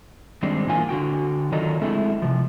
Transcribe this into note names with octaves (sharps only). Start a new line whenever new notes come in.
D#3 G3 G#3 C4 D4
A#2 E3 A#3 F4 G#5
D3 F#4 G5
D#3 F#3 D4 D#4 F4 A4
G#3 A3 C4 E4 G#4 A4
C3 F3